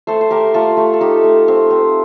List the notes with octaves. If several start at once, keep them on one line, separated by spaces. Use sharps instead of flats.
A3 A4 C5
C5
A3 G4 A#4
A3 F4 A4
A3 G4
A4
D#4 G4
A3
C4
C4